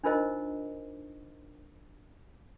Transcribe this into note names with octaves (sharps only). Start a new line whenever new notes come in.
D4 D#4 F4 A#4 C5 D#5